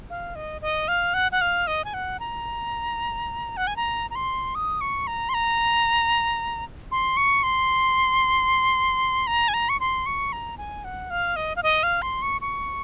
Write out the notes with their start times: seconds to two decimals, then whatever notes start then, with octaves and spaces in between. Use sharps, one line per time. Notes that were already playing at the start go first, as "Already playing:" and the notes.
0.10 F5
0.36 D#5
0.62 D#5
0.88 F5
1.14 F#5
1.32 F#5
1.41 F5
1.67 D#5
1.85 G#5
1.94 F#5
2.20 A#5
3.57 F#5
3.67 G#5
3.76 A#5
4.11 A#5
4.15 C6
4.55 D#6
4.81 C#6
5.07 A#5
5.29 C6
5.34 A#5
6.92 C6
7.17 C#6
7.43 C6
9.27 A#5
9.48 G#5
9.54 A#5
9.69 C#6
9.80 C6
10.06 C#6
10.33 A#5
10.58 G#5
10.84 F#5
11.10 F5
11.36 D#5
11.56 F5
11.63 D#5
11.83 F5
12.02 C6
12.22 C#6
12.41 C#6